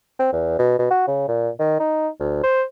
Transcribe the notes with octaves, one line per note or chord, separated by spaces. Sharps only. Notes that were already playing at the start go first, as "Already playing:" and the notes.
C4
E2
B2
B2
F#4
C#3
A#2
D#3
D#4
D2
C5